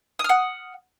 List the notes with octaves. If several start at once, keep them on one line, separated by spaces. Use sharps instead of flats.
F#5 D#6 F6